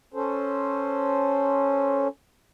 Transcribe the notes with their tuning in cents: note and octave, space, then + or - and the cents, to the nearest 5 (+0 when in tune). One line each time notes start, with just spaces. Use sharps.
C#4 +0 A4 +0 C5 +0